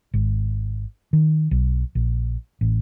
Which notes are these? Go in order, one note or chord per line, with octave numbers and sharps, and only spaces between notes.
G#1
D#3
B1
A#1
A1